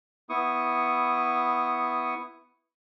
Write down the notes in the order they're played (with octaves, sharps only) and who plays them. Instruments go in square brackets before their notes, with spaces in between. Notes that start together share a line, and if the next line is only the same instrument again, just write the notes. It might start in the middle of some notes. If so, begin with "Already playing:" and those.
[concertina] B3 E4 C#6 D#6